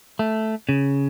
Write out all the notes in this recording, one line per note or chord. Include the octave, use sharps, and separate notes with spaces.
A3
C#3